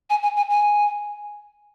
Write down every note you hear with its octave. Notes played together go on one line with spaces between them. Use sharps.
G#5
G#5
G#5
G#5